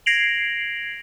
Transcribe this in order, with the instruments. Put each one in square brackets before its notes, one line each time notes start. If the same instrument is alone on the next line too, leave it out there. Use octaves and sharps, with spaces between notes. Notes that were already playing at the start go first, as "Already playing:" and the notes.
[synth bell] G#6 A#6 C7 D7 F7 F#7